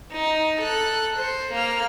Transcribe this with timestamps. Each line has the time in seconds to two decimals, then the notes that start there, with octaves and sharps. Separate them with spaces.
0.13 D#4
0.61 A4 F#6
1.17 C5
1.53 A#3 F6